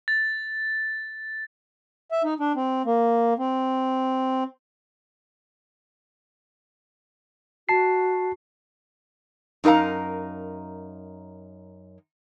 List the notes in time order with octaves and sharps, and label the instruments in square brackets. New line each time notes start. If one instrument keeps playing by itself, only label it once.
[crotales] A6
[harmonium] E5
D#4
D4
C4
A#3
C4
[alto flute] F#4 [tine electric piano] A5 C7
[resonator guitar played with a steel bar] F#2 D#4 A#4 F5 A#5